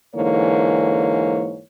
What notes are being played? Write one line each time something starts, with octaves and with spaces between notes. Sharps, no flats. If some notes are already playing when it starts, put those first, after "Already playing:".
G#2 D3 E3 A#3 C#5